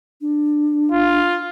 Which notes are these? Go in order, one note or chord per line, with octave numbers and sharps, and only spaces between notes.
D4
F4